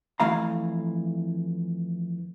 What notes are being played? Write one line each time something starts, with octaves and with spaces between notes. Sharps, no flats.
F2 E3 A3 F5 A#5